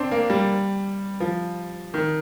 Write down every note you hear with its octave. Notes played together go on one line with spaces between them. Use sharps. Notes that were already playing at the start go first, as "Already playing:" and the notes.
Already playing: C4 D4
A#3
G3
F3
D#3